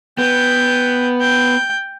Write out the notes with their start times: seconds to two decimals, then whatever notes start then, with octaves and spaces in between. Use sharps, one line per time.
0.18 B3 G5
1.21 G5